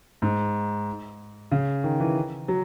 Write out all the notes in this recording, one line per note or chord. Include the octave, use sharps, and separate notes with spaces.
G#2
C#3
D#3
E3
F#3